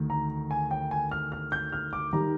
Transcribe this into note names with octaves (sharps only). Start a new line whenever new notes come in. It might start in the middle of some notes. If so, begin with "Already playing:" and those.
Already playing: D2 D#3
A#5
G#5
G5
G#5
F6
F6
G6
F6
D6
D#3 G3 A#5